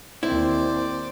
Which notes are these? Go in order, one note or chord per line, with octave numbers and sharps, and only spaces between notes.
D#2 C4 E4 C5 D5 D6